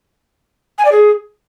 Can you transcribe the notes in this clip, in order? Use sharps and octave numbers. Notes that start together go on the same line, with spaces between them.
G#5
D5
G#4